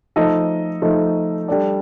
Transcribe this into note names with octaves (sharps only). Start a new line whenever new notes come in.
F3 A3 D#4 A4 D#5
F3 A3 D#4 A4 D#5
G3 D4 A4 D5